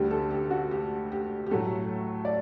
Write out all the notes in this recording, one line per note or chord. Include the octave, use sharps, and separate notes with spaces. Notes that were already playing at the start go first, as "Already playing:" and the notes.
Already playing: D2 D3 G3 G4
A4
G4
F#4
G4
G4
G4
A2 F#3 A3 A4
D5